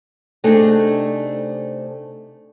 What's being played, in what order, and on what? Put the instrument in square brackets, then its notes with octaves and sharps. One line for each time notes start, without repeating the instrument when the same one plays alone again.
[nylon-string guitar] C3 A3 D4 D#4 G#4 A4